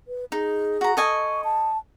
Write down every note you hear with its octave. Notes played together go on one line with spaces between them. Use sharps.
B4
D#4 G#4
F#4 A#5
A4 D#5 G#5 C#6
A5